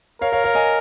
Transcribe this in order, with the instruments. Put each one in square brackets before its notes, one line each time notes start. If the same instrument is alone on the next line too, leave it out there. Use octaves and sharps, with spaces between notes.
[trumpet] A#4 [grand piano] C#5 F5
[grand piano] C#5 F5
C#5 F5
D#5 G#5